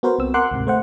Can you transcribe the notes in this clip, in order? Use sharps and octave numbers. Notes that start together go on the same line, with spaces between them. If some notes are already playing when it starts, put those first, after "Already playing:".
B3 F#4 A#4 C5
C2 C3 C4 E6
A#4 F#5 C6 D6 F#6
D2 G#2 C3
A3 C5 F#5